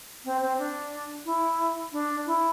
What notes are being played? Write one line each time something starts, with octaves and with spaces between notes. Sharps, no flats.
C4
C4
D4
E4
D4
E4